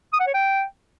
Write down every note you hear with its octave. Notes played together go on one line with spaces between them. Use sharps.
D#6
F#5
C#5
G5